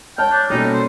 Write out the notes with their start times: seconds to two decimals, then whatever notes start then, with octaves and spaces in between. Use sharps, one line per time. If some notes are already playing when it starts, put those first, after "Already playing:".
0.18 C#5 G5 A5 F6
0.32 D4
0.50 B2 G3 A#3 C#4 D#4 A4
0.73 C5